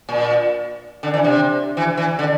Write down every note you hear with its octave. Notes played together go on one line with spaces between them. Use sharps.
A#2
D3
E3
C3
E3
E3
D3